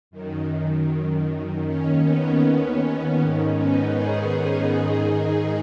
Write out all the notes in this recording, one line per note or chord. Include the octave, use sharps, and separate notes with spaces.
F#2 D#3
D#2 D#3 C#4
B3
B3
C#4
G#2 D#3 C#4
B3 D#4
D#4 G#4
G#2 D#3